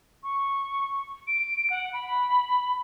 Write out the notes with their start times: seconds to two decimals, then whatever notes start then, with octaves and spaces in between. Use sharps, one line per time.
0.23 C#6
1.27 D7
1.70 F#5
1.93 B5